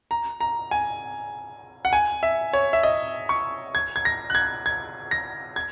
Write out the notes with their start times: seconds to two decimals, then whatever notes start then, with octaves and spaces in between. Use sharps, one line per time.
0.11 A#5
0.40 A#5
0.71 G#5
1.85 F#5
1.93 G#5
2.23 E5
2.53 C#5
2.73 E5
2.83 D#5
3.29 C#6
3.75 G#6
3.96 G#6
4.05 A#6
4.30 F#6
4.35 G#6
4.66 G#6
5.11 A#6
5.56 G#6